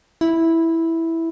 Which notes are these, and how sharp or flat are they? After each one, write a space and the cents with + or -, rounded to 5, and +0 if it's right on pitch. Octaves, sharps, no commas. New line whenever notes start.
E4 -5